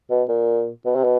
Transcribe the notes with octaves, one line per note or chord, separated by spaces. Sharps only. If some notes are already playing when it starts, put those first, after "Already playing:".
B2
A#2
B2
C3
B2